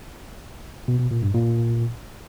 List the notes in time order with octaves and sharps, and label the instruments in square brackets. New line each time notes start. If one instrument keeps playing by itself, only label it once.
[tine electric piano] B2
B2
A#2
G2
A#2